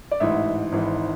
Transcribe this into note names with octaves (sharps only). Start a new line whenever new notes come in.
D5
A1 G#2 E3 E5
G#1 G#2 E3